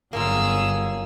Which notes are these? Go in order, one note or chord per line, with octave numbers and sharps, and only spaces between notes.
G1 F#2 A#3 C#4 F4 G#4 E6